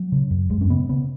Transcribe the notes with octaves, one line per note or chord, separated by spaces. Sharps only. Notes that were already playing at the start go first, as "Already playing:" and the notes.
Already playing: F#3
C#3
F#2
F#2 G#3
C#4
C#3 B3
C#3 B3